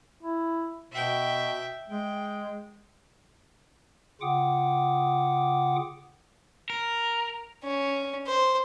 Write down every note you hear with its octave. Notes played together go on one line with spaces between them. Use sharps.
E4
B2 E5 G5
G#3 G5
C#3 F4 F#5 G5 D6 D#6
A#4
C#4
C5